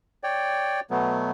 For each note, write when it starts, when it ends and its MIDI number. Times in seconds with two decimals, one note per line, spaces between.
0.23 0.80 73
0.23 0.80 74
0.23 0.80 79
0.90 1.31 47
0.90 1.31 54
0.90 1.31 57
0.90 1.31 59